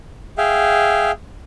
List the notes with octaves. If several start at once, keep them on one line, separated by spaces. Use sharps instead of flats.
G#4 E5 F5 G5